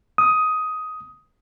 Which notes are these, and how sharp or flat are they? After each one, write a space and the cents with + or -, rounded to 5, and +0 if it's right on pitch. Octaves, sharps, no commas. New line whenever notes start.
D#6 +10